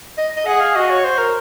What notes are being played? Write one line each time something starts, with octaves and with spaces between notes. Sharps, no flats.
D#5
D#5
G#4 F#5
F5
F#4 D#5
C#5
C5
A#4